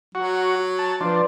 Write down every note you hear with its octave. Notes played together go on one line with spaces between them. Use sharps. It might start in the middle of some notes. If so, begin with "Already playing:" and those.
F#3 F#4
A5
F3 D4 B4 D5 C6